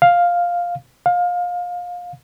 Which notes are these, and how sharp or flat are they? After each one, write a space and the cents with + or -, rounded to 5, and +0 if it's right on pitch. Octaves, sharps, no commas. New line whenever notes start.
F5 +5
F5 +25